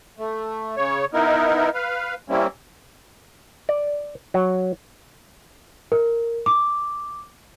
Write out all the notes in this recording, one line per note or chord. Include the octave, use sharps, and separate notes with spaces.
A3
C#3 C#5
B3 D#4 E4 A#4
B4 F5
G3 A#3 C4 C#4 E4
D5
F#3
A#4
D6